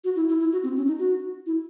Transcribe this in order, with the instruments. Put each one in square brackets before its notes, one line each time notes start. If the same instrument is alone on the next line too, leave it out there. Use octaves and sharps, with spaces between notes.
[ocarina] F#4
E4
E4
E4
F#4
C4
C#4
D#4
F#4
E4